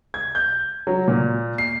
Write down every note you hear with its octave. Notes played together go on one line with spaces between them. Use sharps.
G#6
G6
F#3
A#2
C7